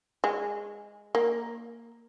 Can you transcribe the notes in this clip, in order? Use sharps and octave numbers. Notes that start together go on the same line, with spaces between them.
G#3
A#3